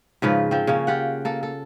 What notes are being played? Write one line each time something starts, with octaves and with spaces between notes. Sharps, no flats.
G#2 C#3 F3 B4
F3 C4
C#3 A#3 C#4
F4 G4 F#5
A#3 A4
A4